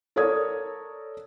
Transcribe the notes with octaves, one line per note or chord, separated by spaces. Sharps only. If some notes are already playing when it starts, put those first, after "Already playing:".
A4 A#4 C#5 D5 D#6 G#6